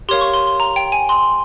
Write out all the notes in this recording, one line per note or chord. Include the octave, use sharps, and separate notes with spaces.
G4 A#4 C#5 F5 C6
C#6
C6
C6
A#5
G5
G#5
C6